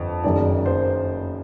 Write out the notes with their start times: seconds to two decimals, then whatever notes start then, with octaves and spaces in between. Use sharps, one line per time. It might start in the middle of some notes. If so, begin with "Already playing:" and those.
Already playing: G1 F2
0.24 F#1 F#2 D#3 D5
0.66 C5